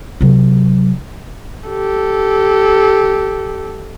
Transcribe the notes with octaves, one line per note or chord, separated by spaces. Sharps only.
C3 F#3
G4 A4